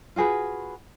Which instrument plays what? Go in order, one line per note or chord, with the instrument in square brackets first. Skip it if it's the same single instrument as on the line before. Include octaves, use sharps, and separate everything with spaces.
[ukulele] F4 F#4 G#4 B4